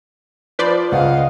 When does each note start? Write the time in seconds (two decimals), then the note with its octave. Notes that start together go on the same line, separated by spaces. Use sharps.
0.59 F3 B4 C5 D5
0.92 C#2 D#5 F5 F#5